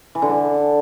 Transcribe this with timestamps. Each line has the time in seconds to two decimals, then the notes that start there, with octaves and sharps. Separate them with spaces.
0.15 E3
0.22 D3
0.29 D4